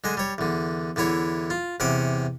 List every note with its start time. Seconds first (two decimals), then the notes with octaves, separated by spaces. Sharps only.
0.04 D3 G#3 D#5 G#5
0.17 G3 C#5
0.38 E2 D3
0.96 E2 D3 E4 C#5
1.50 F4
1.80 E2 C3 C#4 F#5 D6